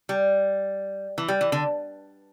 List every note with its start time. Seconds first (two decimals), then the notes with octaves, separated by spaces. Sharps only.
0.09 G3
1.18 E3
1.28 G3
1.41 E3
1.52 D3